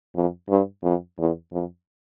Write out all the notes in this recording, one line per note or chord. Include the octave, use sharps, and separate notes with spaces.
F2
G2
F2
E2
F2